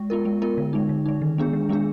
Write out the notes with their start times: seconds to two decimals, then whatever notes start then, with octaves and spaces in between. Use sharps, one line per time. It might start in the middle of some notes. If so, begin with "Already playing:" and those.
Already playing: G#3
0.10 B3 F4 A#4
0.25 G#3
0.42 B3 F4 A#4
0.58 D3
0.73 G#3 D#4
0.89 D3
1.06 G#3 D#4
1.22 D#3
1.38 G#3 B3 D4 G#4
1.53 D#3
1.69 G#3 B3 D4 G#4